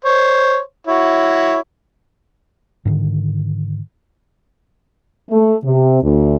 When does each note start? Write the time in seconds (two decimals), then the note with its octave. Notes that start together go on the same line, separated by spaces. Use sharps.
0.05 C5 C#5
0.87 E4 F#4 C#5
2.85 G#2 D3 D#3
5.30 A3
5.64 C3
6.02 D2